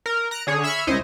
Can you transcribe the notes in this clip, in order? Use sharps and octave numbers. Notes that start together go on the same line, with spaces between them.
A#4
A#5 F#6 A#6 D7
D3 G#4 C#5
E5 B5 C#6 E6 F6 G#6
C#2 E4 C5 C#5 D#5